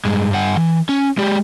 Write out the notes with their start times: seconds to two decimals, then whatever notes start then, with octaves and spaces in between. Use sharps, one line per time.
0.05 G2 G#3
0.30 G2 F#5
0.57 E3
0.89 C#4
1.18 G#3 G4